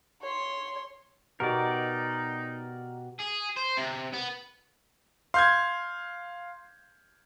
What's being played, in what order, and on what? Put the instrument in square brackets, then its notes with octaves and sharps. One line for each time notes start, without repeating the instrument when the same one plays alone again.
[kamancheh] C#5 C6
[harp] B2 [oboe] D#4 [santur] F#4 G4 D#5 [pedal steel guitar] A#4 D5
[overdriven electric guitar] G#4
C5
C3
B3
[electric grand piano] F5 [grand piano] C6 G6 G#6